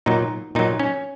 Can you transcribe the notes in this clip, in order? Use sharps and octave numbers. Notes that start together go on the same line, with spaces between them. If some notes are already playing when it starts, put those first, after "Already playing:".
A#2 F#3 D#4
A#2 F#3 D#4
C#4